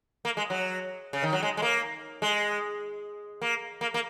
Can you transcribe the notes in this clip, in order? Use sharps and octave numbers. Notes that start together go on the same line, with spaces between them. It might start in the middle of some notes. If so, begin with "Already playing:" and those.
A#3
G#3
F#3
C#3
D#3
F#3
G#3
G#3
A#3
G#3
A#3
A#3
A#3